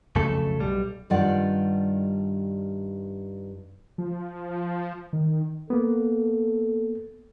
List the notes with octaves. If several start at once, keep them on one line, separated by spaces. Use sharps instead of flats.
B1 F2 C#3 A3 A4
B1 G3
G2 D#3 G3 F4 D5 F#5
F3
D#3
A#3 B3 A4